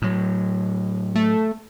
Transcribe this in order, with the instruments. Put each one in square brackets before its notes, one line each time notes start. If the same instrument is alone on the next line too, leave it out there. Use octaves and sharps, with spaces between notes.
[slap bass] A2 F#3
[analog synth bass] A3